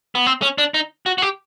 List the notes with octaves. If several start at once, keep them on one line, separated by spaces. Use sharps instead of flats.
B3
C4
C#4
D4
D#4
F#4
F#4
G4